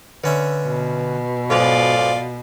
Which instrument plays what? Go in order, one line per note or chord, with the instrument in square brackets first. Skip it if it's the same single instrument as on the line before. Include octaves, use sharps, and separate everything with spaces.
[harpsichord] D3 C#4 E5 [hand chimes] B4
[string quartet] B2
[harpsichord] B1 G#2 [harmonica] F4 D5 [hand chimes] A4